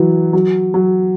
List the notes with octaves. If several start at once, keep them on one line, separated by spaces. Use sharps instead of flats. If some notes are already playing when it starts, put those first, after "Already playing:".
Already playing: E3 F#3
F#3
F#3